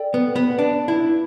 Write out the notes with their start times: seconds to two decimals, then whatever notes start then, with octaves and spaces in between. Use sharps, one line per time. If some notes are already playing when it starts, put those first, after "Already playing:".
Already playing: A4 D5 G5
0.14 B3
0.36 B3
0.58 D4
0.88 E4